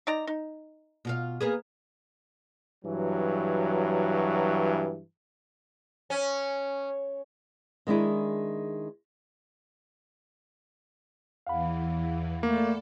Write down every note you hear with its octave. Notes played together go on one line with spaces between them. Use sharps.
D#4 D5 A#5
D#4
B2 F4 F5
A#3 B3 G#4
G2 E3 F#3
C#4
D#3 G#3 D4 E4 G#4
E2 E3 F5 F#5 B5
A3 A#3 A4 D5